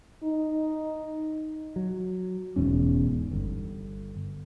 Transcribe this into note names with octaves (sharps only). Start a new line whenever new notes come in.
D#4
F#3
E1 E2 G#2 C#4
G1